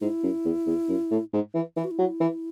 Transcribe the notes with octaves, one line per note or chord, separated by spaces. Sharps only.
G#2 E4
F#2
E2
E2
F#2
A2
G#2
E3
E3 E4
F#4
E4
F#3
E3